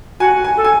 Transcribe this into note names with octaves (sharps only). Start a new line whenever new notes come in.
F#4 G#5
G#5
A4
G#5